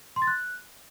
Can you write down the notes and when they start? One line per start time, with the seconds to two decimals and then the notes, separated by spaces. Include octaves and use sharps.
0.16 C6
0.22 A6
0.27 F#6